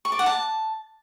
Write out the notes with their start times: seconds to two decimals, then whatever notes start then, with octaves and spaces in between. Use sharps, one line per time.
0.05 C#6
0.12 D5
0.19 F#5
0.26 A5